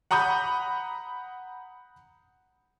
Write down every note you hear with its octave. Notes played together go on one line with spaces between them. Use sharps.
F#5 A#5 B5 D#6 G6